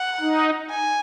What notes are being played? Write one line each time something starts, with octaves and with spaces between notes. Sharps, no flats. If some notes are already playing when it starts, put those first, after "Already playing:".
Already playing: F#5
D#4
G#5